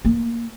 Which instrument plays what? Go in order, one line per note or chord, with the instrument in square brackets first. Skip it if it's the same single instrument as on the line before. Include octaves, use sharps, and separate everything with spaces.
[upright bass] A#3